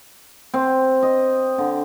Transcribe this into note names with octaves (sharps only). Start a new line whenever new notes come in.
C4
D#5
D3